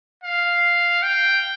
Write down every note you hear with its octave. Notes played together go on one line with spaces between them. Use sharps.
F5
G5